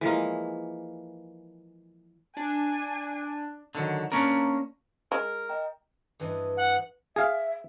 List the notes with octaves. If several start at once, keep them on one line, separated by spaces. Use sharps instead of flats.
E3 F3 G#3 A#3
D4 G#5
D3 D#3 F#3
A#3 C#4 D4 A#4
G#3 A#4
D#5 G5 A#5
G2 E3 D#5
F#5
G#4 E5 F5